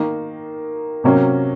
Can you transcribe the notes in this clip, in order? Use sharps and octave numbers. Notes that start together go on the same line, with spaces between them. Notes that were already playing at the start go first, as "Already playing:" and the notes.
Already playing: D#3 A#3 D#4
C3 F#3 A#3 C#4